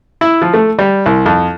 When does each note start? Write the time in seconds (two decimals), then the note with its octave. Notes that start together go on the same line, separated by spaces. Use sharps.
0.21 E4
0.42 F3
0.54 A3
0.79 G3
1.06 C2
1.26 F2